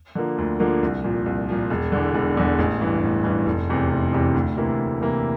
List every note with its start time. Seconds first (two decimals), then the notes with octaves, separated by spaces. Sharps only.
0.15 D3 F3 A#3
0.38 D2
0.60 D3 F3 A#3
0.83 C2
1.04 A#2 F3
1.26 C2
1.49 A#2 F3
1.70 E1
1.92 E2 D3
2.15 E1
2.37 E2 D3
2.59 A1
2.81 G2 E3
3.03 A1
3.24 G2 E3
3.46 F1
3.69 E2 C3 E3
3.90 F1
4.12 E2 C3 E3
4.34 D2
4.57 C3 E3 A#3 E4
4.78 D2
5.01 C3 E3 A#3 E4